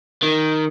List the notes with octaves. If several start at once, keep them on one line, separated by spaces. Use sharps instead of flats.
D#3